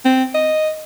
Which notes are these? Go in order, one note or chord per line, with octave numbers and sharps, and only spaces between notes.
C4
D#5